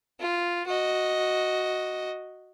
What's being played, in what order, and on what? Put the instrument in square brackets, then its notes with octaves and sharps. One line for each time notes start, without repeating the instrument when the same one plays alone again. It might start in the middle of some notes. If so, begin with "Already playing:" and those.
[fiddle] F4
F#4 D#5